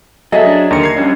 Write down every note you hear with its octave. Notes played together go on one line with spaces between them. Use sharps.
F#3 G#4 A4 D#5 E5
D4
D#2 D3 A#4 C#7
G#6 C7
G3 C#4 D4